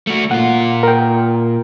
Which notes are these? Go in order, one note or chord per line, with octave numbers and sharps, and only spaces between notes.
A3 F#4
A#2 F4 F#5
A#4 G5